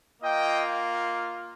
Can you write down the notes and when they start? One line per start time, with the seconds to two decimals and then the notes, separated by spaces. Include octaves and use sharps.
0.22 A#3 F4 D#5 G5